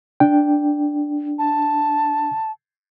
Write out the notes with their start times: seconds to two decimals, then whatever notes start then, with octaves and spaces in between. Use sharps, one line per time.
0.20 D4 G5
1.39 A5